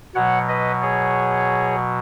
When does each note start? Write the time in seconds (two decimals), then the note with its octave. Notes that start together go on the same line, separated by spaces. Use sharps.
0.15 B2 F#3 C#5 F#5
0.49 B4 D#5
0.82 G#4 C#5